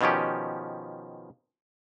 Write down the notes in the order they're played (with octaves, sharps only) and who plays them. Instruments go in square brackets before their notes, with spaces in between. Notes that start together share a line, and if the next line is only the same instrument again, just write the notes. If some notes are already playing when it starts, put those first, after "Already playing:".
[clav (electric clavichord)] B2 D#3 F3 C#4 G4